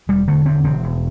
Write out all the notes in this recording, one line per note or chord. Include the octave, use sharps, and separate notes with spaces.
E1 G3
D3 A3
E2 C4
E1 C4
E1